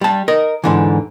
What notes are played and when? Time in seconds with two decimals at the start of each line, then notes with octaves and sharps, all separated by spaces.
0.01 G3 A5
0.28 A#4 D#5
0.64 G#2 D3 E3